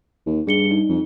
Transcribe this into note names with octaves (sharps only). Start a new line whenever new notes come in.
D#2
G2 G#4 C#7 G7
D#4
F2